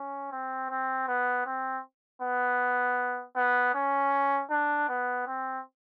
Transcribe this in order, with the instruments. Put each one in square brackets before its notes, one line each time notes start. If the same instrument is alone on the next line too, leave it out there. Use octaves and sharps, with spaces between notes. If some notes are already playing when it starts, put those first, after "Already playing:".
Already playing: [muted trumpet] C#4
C4
C4
B3
C4
B3
B3
C#4
D4
B3
C4